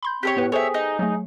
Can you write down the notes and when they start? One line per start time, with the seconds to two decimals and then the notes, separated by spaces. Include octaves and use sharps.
0.03 B5 C6 G6
0.23 C4 G4 A4 C#5
0.37 A2 B3 B4
0.52 G#4 A4 C5 C#5 E5 G5
0.74 D#4
0.99 F#3 A3 G#4